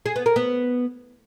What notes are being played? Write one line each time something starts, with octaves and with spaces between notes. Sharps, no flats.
G#4
B3
A#4
B3